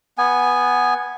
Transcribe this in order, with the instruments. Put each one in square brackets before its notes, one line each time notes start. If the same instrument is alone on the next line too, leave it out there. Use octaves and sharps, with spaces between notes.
[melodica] B3 G#5